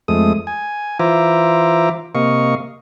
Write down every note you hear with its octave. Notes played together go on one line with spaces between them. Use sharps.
F2 G#3 A3 D#6
G#5
E3 F4 C5 E5 A#5 D6
C3 A#3 D#5 F5 C#6